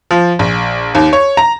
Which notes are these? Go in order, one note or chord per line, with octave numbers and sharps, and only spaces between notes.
F3
A#1
D#2
C#5
A#5